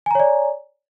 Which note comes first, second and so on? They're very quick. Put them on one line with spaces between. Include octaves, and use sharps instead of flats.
G#5 A#5 C#5 D5